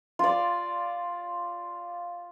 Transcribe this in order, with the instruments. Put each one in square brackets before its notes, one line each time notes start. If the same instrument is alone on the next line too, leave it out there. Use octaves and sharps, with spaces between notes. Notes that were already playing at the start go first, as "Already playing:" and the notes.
[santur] F4 D5